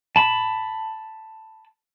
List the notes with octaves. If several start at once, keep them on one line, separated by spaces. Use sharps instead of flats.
A5 B5